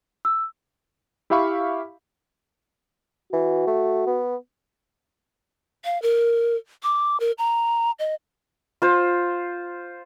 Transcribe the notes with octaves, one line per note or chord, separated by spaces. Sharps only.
E6
E4 G4 E5 F5 B5 C#6
E3 F#4
A3
B3
F5
A#4
D6
A#4
A#5
D#5
F4 C5